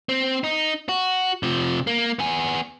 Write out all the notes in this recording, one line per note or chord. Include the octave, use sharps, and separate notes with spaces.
C4
D#4
F#4
C3 F3
A#3
B3 G#5